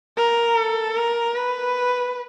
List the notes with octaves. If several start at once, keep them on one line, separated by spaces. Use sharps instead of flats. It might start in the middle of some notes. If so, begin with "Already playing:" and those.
A#4
A4
A#4
B4